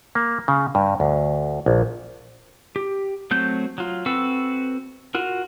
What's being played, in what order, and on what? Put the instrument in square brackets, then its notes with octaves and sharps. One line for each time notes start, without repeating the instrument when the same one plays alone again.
[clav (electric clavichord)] A#3
C#3
G2
D2
A#1
[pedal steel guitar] G4
F#3 A3 C4 G6
F#3 F4
C4 F#4 A4 B4 E6
F4 F#4 A#4